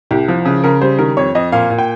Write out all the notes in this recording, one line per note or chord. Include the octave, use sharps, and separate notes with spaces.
C2 G4
F3
C#3
C#3 A#4
G3 C5
D#3 A#4
F2 C#5
F2 D#5
A#2 F5
A#2
G5